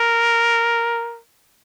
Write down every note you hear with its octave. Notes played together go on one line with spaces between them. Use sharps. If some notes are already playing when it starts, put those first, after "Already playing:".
Already playing: A#4